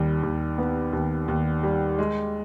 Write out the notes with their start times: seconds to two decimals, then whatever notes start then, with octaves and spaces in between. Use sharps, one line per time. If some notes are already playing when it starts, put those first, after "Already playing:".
Already playing: D#2 G3
0.23 D#2
0.58 B3
0.93 D#2
1.28 D#2
1.63 G3
1.99 G#3